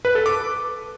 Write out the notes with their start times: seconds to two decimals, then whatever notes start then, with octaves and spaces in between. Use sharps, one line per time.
0.05 B4
0.15 A4
0.26 D6